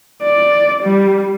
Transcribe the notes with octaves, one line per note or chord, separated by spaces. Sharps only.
D5
G3